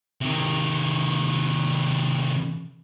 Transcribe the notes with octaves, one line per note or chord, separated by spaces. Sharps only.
C3 D#3